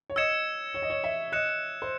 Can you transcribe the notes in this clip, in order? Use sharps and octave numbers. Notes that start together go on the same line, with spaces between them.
C#5
D#5 E6 G#6 C#7 E7
C#5
D#5
C#5
E5
D#5 F#6 C#7 E7
C5